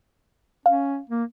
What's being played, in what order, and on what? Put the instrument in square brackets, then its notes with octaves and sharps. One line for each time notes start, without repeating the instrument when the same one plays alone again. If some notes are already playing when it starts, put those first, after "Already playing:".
[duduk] C#4 [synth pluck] F5
[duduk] A#3